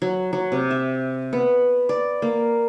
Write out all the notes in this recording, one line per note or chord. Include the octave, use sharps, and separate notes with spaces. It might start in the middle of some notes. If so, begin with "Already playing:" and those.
F#3
F#3
C3
E5
B3
D5
A#3